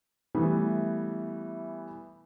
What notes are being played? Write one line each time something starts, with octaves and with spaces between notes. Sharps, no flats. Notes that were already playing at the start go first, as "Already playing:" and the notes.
E3 G3 A3 B3